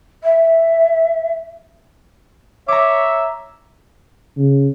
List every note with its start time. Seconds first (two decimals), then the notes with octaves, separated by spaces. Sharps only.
0.23 E5
2.68 C#5 E5 A#5 D6
4.37 C#3